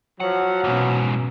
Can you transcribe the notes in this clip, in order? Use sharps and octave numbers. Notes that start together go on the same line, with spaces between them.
F3 F#3 F#5
G#2 B2 E3 C#4